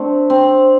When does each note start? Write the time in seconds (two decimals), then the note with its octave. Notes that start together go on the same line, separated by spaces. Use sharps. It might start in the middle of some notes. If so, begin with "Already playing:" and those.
Already playing: A3 C4 D4
0.30 C4